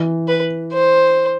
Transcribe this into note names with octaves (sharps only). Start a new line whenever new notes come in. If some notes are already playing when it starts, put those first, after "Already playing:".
Already playing: E3
B4
C5